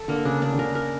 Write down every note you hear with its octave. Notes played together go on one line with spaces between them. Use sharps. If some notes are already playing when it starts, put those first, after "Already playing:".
Already playing: A4
D3 A#3
C#3 D4
C#3 D4
D3
C#3 A#4
A#4